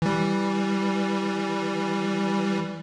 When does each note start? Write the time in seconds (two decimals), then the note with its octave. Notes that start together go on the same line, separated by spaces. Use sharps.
0.02 E3 G3